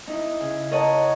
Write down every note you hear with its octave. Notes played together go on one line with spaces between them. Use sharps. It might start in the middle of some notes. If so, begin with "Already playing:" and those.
D#4 E4
C#3
A#4 C#5 D#5 F#5 A5 A#5